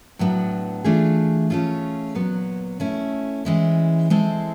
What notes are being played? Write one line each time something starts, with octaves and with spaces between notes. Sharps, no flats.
A2 F#3 B3 D4
E3 A3 D4 F4 G#4
A3 C#4 F4 G#4
A#2 F#3 B3
A3 C#4 E4
E3 G#3 C#4 E4
G#3 C4 E4 A4